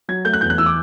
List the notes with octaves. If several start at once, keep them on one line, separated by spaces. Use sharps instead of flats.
F#3 G#6
A3 G6
F#6
E2 G6
F#6
E3 E6
D6